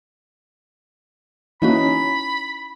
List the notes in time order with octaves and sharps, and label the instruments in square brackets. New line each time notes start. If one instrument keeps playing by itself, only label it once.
[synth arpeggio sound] E3 A#3 F#4 [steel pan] C#4 D#4 E4 [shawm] B5
[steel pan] C#4